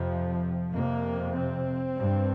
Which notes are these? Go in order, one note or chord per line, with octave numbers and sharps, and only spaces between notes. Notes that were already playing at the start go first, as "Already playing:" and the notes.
Already playing: F2 C3 F3
F2 C3 A#3
C4
G2